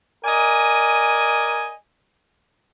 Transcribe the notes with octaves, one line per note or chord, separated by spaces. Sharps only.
A#4 D5 D#5 G#5